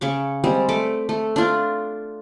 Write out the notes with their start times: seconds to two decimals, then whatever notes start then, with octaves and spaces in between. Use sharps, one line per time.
0.01 C#3 C#6 D6
0.44 G3 G#3 C4
0.69 A3 D6
1.09 A3
1.36 D4 F4